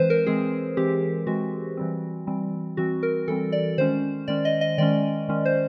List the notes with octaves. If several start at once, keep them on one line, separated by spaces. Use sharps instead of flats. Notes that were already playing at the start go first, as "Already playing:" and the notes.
Already playing: E3 G#3 C4 B4 C5
A#4
E3 G#3 C4 G#4
E3 G#3 C4 G4
E3 G#3 C4 F#4
E3 G3 C4
E3 G3 C4
E3 G3 C4 F#4
A#4
E3 G3 C4 A4
D5
D#3 G#3 C#4 C5
D#3 G#3 C#4 D5
D#5
D#5
D#3 G#3 C#4 D5
D#3 G#3 C#4
C5